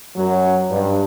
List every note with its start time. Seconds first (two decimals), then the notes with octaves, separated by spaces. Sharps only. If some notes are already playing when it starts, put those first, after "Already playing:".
0.16 F#2 F#3
0.71 G2